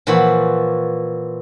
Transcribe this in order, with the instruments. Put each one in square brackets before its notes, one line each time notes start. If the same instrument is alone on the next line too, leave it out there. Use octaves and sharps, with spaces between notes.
[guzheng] A#2 E3 F3 F#4 B5